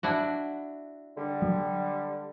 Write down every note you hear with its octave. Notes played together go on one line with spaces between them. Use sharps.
D4 E4 F#4
D3 G3
F#3